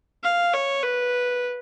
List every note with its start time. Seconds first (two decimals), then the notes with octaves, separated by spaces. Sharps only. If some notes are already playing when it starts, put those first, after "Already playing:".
0.23 F5
0.53 C#5
0.83 B4